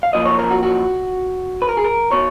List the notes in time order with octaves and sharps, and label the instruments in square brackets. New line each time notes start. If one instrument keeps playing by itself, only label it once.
[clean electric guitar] F5
F#2 F3 A#3 D#5
C#5
A#4
F#4
F#4
B4
A#4
G#4
A#4
B2 C#5